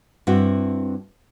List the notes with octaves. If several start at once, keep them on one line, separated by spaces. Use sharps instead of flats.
G2 C4 E4 F#4